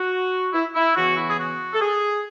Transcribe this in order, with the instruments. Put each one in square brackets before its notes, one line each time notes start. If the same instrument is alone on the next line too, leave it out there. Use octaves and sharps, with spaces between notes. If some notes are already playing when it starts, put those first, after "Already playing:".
Already playing: [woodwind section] F#4
E4
E4
C#3 E3 B3 F#4
E4
G#4
F#4
A4
G#4